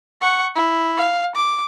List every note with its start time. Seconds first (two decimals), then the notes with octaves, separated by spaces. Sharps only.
0.21 F#5 C#6
0.55 E4
0.97 F5
1.35 D6